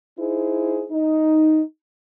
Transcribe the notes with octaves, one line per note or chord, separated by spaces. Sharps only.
D#4 E4 G#4 C5
D#4